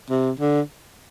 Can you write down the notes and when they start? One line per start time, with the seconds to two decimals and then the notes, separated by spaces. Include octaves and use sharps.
0.10 C3
0.40 D3